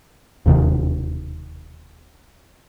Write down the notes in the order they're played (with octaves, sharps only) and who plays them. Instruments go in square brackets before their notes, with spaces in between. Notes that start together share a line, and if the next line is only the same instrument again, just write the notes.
[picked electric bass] E1 D#2 C3 D#3